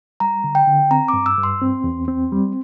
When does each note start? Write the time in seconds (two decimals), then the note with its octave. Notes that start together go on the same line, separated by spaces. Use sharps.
0.20 G3 A#5
0.44 D3
0.55 G5
0.67 D3
0.91 C4 A#5
1.08 D6
1.13 G2
1.26 E6
1.38 G2
1.43 C6
1.62 C4
1.84 E2
2.08 C4
2.32 G3